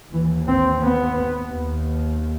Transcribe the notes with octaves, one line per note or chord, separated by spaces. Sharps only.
D#2 E3
C4
B3
D#2